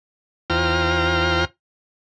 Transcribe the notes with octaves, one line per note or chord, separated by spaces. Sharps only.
E2 F4 C5 G5 A#5 F6